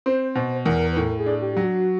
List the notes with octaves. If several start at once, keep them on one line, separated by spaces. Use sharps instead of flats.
C4 C5
B2 C5
E2 A#4
B4
A2 A#4
G#4
D4
G4
F#3 G4
F#4